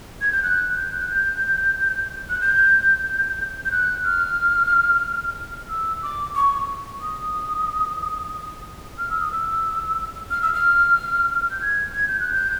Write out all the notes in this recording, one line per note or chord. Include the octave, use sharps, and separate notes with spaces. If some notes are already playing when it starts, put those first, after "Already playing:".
G#6
G6
F#6
G6
F#6
G6
F#6
G6
G6
F#6
F6
E6
D6
C#6
D#6
F6
E6
D#6
E6
F6
E6
F6
G6
G#6
G#6
G6
F#6
G6